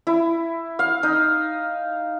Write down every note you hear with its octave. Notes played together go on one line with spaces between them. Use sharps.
E4
F5
D#4